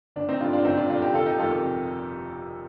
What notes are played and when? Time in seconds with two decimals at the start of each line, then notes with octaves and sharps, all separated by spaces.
0.16 G1 D4
0.29 C4 D#4
0.40 G2 D3 D4 F4
0.53 D4 F4
0.65 G1 C4 D#4
0.77 D4 F4
0.89 G2 D3 D4 F4
1.02 D#4 G4
1.14 F1 F4 A4
1.26 D#4 G4
1.38 F2 D#3 F4 A4
1.50 G4 A#4
1.62 F1